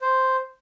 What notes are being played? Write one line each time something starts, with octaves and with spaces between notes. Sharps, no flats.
C5